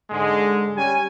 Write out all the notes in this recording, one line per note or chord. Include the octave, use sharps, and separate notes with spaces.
G#2 D3 G#3
G3 C#4 G#5